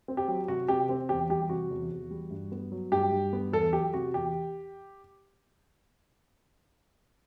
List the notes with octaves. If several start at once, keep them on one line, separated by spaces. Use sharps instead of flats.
C4
G4
F#3
C3 F#4
C3 G4
C4
E2 G4
G3 G4
C3 F#4
E2
E2
G3
G2
B3
F#3
G2 G4
G2
B3
E2 A4
F#3 G4
C3 F#4
E2 G4